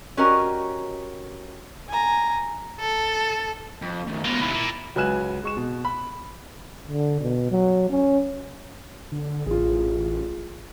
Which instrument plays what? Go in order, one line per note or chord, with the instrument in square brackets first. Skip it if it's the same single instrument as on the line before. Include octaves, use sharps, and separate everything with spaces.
[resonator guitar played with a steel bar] C#4 F#4 G4 A#4 D#5
[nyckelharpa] G#5 A#5
[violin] A4
[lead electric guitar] F2
D#3 A3
[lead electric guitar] G#3 B3 [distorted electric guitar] A#3 F4
[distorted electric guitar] D#2 C3 [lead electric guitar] E4 B5
[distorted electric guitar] A#2
[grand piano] C#2 F#3 B4 G#5 F#6 E7
G#3 C#6 E7
B2
B5
[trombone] D3
B2
F#3
C#4
[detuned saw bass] D3
[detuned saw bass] A1 [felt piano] F4 G#4